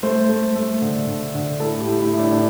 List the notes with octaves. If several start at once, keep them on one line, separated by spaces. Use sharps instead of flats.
A3 C5
A3
A3
D3
D3
D3
A2 A4
G4
A2
E4
A2
D4
D4